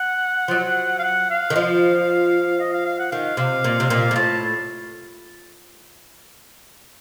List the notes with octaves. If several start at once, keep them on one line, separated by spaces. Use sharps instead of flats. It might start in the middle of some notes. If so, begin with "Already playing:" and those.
Already playing: F#5
F3
F#3
F5
F#5
F5
D#3
F3
D#5
F5
F5
F#5
D#3 F5
C3 F5
A#2
C3
A#2
A#2
A2 A5